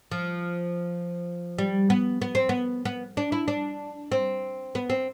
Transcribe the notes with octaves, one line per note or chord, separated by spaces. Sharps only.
F3
G3
B3
B3
C4
B3
B3
D4
E4
D4
C4
B3
C4